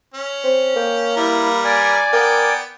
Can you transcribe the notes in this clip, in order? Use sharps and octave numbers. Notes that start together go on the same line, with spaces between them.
C#4
C4
A#3 G5
G3 E4 A#4 B4
D5 G#5 D6
B3 A#4 G5